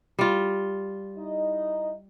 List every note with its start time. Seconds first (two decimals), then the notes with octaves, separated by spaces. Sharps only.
0.19 G3 F4
1.16 D#4 E4 D#5